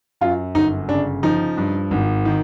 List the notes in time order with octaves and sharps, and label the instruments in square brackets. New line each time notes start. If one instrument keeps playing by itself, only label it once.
[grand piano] F#2 [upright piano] F4
[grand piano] G1 [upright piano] D#4
[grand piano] C#3 [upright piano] D4
[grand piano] F3 [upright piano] D#4
[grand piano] G2
G#1
D#3